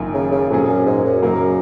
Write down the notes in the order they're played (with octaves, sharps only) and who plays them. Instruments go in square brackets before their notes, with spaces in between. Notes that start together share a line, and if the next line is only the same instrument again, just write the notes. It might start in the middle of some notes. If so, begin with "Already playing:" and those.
Already playing: [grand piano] F#1 F#2 D#3 A#3 F4
[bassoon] C#3
C#3
[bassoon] F2 [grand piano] A#2 F#3 C#4 G#4
[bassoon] F#2
G#2
F#2
[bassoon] F#2 [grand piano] C#3 F#3 A#3 D#4 A#4